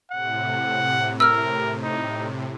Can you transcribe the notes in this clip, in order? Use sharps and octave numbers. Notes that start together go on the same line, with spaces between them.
A2 C3 F#5
A#4 E6 F6
D#4